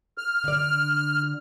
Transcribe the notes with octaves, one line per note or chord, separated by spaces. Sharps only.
F6
D3 D5